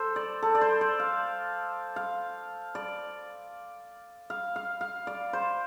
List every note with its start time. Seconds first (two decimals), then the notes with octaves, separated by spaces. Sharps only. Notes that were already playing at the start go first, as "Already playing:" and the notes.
Already playing: A4 C5
0.16 D5
0.42 A4
0.55 D5
0.61 C5
0.81 D5
1.00 F5
1.96 F5
2.75 D5
4.30 F5
4.56 F5
4.81 F5
5.07 D5
5.33 C5